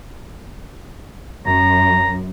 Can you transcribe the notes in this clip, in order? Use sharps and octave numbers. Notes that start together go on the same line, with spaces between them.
F#2 A#5